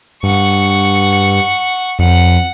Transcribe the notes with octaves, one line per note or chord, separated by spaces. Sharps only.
G2 F#5 C#6
F2 F#5